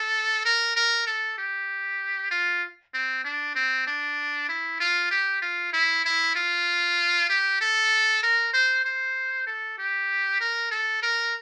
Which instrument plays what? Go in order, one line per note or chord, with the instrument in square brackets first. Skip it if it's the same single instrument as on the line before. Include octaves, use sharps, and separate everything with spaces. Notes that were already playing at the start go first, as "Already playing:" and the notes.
Already playing: [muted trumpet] A4
A#4
A#4
A4
G4
F4
C4
D4
C4
D4
E4
F4
G4
F4
E4
E4
F4
G4
A4
A#4
C5
C5
A4
G4
A#4
A4
A#4